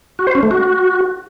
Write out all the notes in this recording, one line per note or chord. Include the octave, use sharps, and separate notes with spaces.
F#4
C5
C#4
A3
F#4